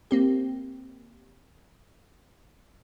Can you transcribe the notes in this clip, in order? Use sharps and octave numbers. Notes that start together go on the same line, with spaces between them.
A#3 C4 G4